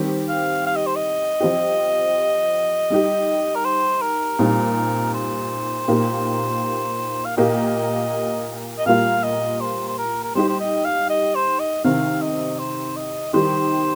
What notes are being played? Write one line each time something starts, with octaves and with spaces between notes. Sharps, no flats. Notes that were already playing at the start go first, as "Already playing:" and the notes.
Already playing: D#3 G3 C4 G4
F5
F5
D#5
C5
D#5
F3 C4 G4
G3 D#4 G4
A#4
C5
A#4
A#2 G3 C4 D#4
C5
A#2 A#3 D#4 G4
F5
A#2 A#3 G4 D#5
D#5
A#2 G3 A#3 F4 F5
D#5
C5
C5
A#4
A#4
G3 D#4 G4 C5
C5
D#5
F5
D#5
C5
D#5
C3 D#3 C4 F5
D#5
C5
D#5
D#3 G3 D#4 G4 C5